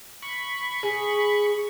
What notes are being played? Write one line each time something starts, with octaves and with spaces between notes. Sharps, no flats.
B5 C#6
G#4